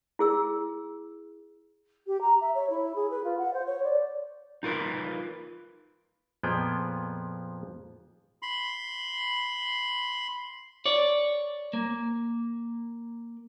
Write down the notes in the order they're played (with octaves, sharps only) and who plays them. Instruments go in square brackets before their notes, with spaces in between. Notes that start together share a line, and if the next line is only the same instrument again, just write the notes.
[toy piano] E4 G#4 E6
[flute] G4
A#5
E5
C#5
E4
G#4
B4
F4
F#5
C5
C#5
D5
[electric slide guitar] D#4 F4 A#4 B4
[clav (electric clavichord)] F2 A#2 F3 B3 G#4 G5
[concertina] B5 C6
[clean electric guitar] C#5 D5
A#3